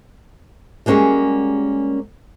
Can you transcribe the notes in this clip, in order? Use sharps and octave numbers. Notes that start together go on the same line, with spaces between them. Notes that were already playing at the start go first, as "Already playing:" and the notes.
G3 G#3 A#3 C#4 F#4 G#4